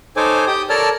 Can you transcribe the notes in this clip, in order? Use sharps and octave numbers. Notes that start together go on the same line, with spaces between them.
D#4 A4 C5 C#5 G#5 D6
G4 G5 D#6
A4 A#4 C#5 D5 A5 F6